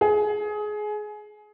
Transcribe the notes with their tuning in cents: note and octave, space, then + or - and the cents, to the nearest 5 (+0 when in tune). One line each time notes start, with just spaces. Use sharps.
G#4 +20